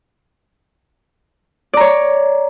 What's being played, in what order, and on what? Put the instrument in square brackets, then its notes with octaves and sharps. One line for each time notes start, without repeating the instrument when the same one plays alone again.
[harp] D5
A#5
C#5